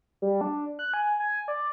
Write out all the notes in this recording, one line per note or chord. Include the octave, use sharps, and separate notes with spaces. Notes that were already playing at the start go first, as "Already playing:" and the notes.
G3
D4
F#6
G#5
G#5
D5